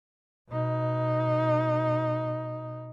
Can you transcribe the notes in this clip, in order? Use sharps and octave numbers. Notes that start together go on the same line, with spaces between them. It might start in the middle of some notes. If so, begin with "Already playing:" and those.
B2 D#4